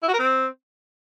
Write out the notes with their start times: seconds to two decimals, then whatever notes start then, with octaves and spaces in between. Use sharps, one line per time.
0.03 E4
0.08 F#4
0.14 A#4
0.19 C4